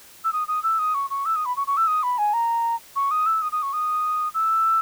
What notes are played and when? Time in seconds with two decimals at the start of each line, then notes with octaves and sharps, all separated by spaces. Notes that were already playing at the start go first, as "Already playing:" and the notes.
0.24 E6
0.33 D#6
0.48 D#6
0.63 E6
0.79 D#6
0.94 C#6
1.10 C#6
1.26 E6
1.36 D#6
1.45 B5
1.57 C#6
1.67 C#6
1.77 E6
1.87 D#6
2.03 B5
2.18 G#5
2.33 A#5
2.96 C#6
3.11 D#6
3.26 E6
3.42 D#6
3.52 D#6
3.63 C#6
3.73 D#6
4.34 E6